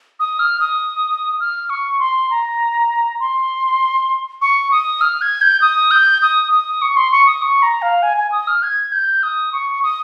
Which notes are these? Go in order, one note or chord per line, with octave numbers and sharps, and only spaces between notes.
D#6
F6
D#6
F6
C#6
C6
A#5
C6
C#6
D#6
F6
G#6
G6
D#6
G6
D#6
D#6
C#6
C6
C#6
D#6
C#6
A#5
F5
G#5
G#5
D#6
F6
G#6
G6
D#6
C#6
D#6